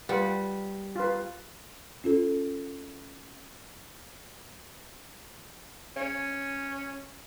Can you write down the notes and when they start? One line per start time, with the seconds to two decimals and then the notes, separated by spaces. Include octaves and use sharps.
0.09 G3 F4 B4 F#5
0.96 F4 B4
2.04 C#4 F4 A4
5.96 C#4